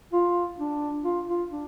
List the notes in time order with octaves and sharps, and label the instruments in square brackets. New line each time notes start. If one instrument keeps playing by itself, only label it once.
[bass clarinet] F4
D4
F4
F4
D4